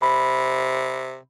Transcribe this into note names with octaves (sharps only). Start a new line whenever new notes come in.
C3 B5